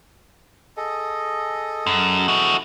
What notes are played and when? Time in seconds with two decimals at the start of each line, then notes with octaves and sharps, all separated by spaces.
0.77 G#4 A4 D#5
1.87 F#2
2.28 E4 F#4